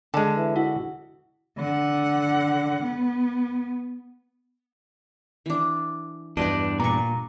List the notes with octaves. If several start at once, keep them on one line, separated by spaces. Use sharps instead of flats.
D3 G#3 A5
E3
E4 F#4
D3 F#5
B3
E3 D4
E2 G2 D4 G4 D#5
A#2 D4 A#5 C#6